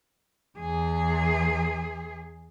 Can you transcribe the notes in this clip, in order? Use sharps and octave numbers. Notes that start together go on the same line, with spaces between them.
E2 G#4